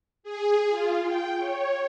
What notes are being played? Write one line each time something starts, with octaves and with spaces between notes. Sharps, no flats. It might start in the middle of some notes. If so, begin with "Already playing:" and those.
G#4
F4
G5
C#5